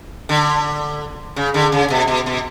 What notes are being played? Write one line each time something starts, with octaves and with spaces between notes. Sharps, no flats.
D3
C#3
D3
C#3
B2
B2
B2